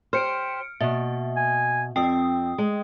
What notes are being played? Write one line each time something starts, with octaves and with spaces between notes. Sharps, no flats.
G4 C5 F6 C#7 D7
B2 A#3 E5
G#5
F2 C4 G5 D#6
G#3